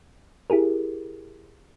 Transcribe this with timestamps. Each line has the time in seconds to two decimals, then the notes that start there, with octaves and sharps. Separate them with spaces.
0.50 E4 G4 G#4 A#4